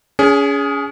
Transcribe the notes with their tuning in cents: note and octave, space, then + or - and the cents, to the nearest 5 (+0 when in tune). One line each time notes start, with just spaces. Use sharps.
C#4 +35 G#4 +0